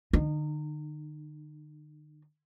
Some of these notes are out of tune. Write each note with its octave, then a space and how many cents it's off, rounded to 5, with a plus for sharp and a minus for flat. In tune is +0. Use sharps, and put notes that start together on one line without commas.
D3 +40 D#4 -30